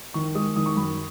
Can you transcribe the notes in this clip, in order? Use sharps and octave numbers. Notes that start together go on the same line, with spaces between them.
D#3 C#6
G#3 D#6
D#3 D#6
C#6
F#2 B5